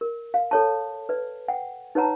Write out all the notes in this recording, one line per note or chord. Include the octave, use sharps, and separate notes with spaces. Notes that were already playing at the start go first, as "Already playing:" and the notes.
A#4
F5
A4 C#5 A5
B4 D5
F#5 G5
D#4 B4 C#5 F#5 A5 A#5